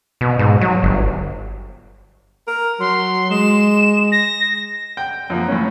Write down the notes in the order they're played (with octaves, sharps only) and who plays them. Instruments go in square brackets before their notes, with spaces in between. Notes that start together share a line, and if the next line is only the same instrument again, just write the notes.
[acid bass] B2
G#2
F#3
G1
[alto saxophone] A#4
[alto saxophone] F#3 [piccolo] C6
[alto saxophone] G#3 [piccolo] E7
[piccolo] A#6
[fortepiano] G5
F#2 F3 A#3
A2 C#4